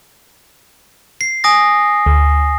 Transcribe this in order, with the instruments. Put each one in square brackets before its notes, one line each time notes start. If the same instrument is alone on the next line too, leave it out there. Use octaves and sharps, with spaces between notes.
[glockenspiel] C7
G#5 D#6 A#6
[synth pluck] D2